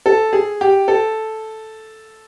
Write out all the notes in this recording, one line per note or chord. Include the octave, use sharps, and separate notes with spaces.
A4
G#4
G4
A4